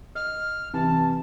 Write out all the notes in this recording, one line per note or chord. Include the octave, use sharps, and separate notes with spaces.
D#5 F6
C3 E3 A5